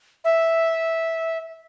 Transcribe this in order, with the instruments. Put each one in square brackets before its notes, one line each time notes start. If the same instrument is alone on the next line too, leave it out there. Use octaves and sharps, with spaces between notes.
[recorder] E5